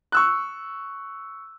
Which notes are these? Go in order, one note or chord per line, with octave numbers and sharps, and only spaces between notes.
C#6 E6 F#6